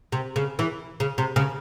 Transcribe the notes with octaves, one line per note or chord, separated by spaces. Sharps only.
C3
C#3
E3
C#3
C3
C#3